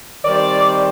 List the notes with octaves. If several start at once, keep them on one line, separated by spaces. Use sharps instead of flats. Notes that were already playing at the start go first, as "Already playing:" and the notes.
D#3 G3 C4 D5